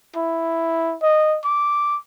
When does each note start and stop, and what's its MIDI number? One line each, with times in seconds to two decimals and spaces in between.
0.16 0.96 64
1.03 1.38 75
1.44 1.97 86